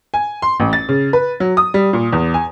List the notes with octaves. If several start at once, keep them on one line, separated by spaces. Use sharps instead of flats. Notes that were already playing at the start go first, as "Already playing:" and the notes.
G#5
C6
A1
A6
C#3
B4
F#3
D#6
G3
A#2
E2
G#5